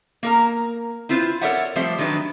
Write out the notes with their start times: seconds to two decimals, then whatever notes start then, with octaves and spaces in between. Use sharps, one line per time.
0.23 A#3 A#4 A#5
1.09 C4 E4 F4 B4 C5
1.42 A4 A#4 C#5 D5 E5 F#5
1.75 F3 G3 A3 C4 C5 E5
1.98 D#3 F#3 D4 B4